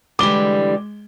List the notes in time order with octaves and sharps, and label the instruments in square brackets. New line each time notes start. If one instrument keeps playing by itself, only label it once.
[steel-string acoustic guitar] D3 E3 G3 [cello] G#3 [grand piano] D6 G7